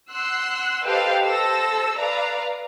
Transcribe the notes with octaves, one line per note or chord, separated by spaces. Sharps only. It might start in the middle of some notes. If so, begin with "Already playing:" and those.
F#5 C6 E6 F#6 C7
G4 A4 B4 C5 D#5 F5
A4 C5 E6 A#6
B4 D5 F5 A#5